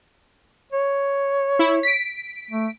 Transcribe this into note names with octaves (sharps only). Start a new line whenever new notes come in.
C#5
E4
B6 D7
A3